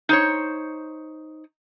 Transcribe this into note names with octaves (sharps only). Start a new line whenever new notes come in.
D#4 C5 C#5